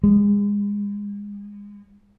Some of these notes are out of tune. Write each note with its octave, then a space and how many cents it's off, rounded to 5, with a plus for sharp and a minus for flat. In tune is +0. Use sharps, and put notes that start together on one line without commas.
G#3 -30